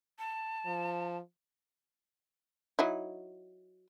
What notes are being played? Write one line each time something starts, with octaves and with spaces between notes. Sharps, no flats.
A5
F3
F#3 D#4 E4